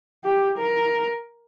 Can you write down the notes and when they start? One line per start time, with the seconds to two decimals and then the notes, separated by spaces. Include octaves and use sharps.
0.24 G4
0.58 A#4